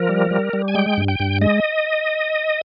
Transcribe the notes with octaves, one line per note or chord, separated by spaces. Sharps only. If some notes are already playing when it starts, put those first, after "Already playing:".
Already playing: F3 A#4
G3
G3
G3
G#5
G#3 G5
G2
G5
G2
G#3 D#5